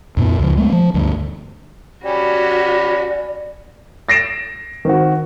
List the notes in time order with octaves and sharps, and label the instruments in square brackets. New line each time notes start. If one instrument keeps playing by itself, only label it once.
[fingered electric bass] F2 A#2 B3
C#2 F3
G#3 A3 B3
F3
D2 G2
[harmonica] C#4 G4 B5 [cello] F#4 [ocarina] D5
[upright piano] A6 A#6 C7 D7 E7
D#3 C4 F#4